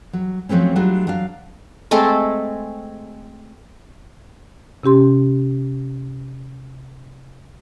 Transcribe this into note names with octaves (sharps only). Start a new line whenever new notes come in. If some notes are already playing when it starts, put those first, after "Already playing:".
F#3
F3 F#3 A3 C4 C#4
F#3 G3 A3 D4 F4
F#3 D4 F5
G#3 A3 C4 A4
C3 C#4 G4 C6